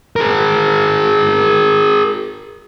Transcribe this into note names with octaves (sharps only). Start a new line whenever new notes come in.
G#4 A#4